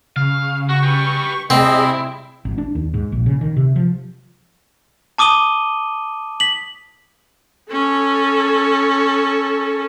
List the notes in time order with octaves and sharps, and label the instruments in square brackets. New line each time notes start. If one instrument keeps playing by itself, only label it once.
[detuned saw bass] C#3 [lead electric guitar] F5
[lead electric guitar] F#4 [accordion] C#6
[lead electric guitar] G4 B4
[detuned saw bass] C3 [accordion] G3 G#4 D#5 [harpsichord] C4 [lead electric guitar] E4
[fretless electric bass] G#1
D4
D#2
G#2
A#1
C#3
D#3
C3
F3
[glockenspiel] A5 D6 D#6 D#7 G7
B6 F#7
[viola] C#4 A4